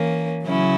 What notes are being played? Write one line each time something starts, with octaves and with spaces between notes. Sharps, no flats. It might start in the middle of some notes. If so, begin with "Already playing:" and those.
Already playing: E3 A#3 C#4
C#3 F#3 C#4 E4